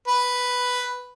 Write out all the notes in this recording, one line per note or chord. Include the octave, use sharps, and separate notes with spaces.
B4